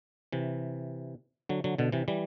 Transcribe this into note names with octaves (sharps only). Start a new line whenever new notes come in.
C3 E3
D3 F#3
D3 F#3
B2 D3
C3 E3
E3 G3